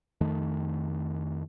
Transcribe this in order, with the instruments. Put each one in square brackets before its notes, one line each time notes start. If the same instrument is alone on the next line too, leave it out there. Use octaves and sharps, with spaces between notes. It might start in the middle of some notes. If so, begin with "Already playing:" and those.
[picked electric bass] F2 D#3 A3